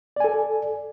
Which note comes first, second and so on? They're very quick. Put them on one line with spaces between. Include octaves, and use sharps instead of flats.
D5 G#5 A4